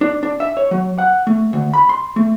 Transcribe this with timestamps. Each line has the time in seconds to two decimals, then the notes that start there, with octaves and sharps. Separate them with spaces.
0.01 D4
0.23 D4
0.40 E5
0.57 C#5
0.71 F#3
0.98 F#5
1.27 A3
1.53 D2
1.74 B5
1.89 C6
2.16 A3